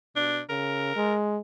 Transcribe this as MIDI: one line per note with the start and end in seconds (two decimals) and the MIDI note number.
0.16 0.41 47
0.16 0.40 62
0.49 0.95 49
0.49 1.14 70
0.96 1.39 56